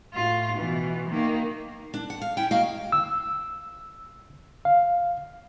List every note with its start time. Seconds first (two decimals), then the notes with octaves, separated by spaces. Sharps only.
0.15 A2 F4
0.57 B2 E3
1.09 D#3 A#3
1.94 D4
2.10 F#5
2.21 F5
2.37 C#4 E4 G5
2.51 A#3 F#4 D#5 F5
2.92 E6
4.65 F5